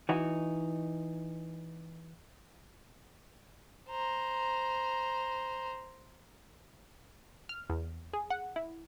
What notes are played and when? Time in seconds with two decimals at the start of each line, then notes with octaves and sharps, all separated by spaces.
0.09 E3 D#4 F#4
3.89 C5 A#5
7.49 F6
7.70 E2
8.13 G#4
8.30 F#5
8.56 E4